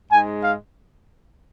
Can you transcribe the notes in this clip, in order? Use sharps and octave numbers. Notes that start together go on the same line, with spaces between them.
G#2 G#3 G#5
F5